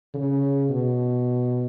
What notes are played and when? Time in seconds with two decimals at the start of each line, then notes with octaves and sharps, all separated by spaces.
0.14 C#3
0.70 B2